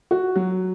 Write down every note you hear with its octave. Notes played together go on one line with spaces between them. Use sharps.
F#4
F#3